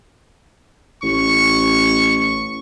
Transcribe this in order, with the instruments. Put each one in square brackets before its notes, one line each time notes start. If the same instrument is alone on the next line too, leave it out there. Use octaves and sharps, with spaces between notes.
[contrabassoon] A1 [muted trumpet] C#6